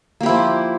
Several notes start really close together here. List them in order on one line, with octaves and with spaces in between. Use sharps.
A#3 G4 E4 F3